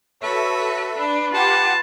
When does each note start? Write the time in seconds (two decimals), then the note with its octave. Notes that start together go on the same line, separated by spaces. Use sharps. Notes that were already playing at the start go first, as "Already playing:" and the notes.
0.23 F#4 A4 B4 C#5 E5
0.98 D4 B4
1.33 F4 G4 F#5 A5